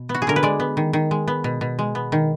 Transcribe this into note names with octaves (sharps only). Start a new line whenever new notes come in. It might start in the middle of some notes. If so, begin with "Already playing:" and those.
Already playing: B2
B3
F#4
G#4
D3 A#4
B4
G#3 D5
B3
D#3
D#3
G#3
B3
B2
B2
G#3
B3
D#3